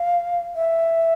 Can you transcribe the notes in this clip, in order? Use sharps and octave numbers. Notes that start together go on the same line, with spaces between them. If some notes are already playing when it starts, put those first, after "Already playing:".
Already playing: F5
E5